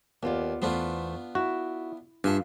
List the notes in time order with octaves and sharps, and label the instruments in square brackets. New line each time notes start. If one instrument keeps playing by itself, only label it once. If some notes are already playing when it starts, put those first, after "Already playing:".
[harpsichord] D#2 [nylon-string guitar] B3 F4 D5
[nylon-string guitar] E2 A3 C5 [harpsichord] B3 D4 F4
[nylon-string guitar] E4 [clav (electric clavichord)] F#4
[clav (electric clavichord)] G2 [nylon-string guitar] D4 F4 [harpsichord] A4 E5 G#5